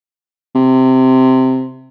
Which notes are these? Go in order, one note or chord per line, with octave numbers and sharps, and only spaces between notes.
C3